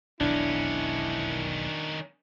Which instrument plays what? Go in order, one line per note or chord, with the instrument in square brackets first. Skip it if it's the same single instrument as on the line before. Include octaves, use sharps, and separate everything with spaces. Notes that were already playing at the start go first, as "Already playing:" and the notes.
[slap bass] E1 B1 F2 [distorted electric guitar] D#3 C#4 [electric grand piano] D4 [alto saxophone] E4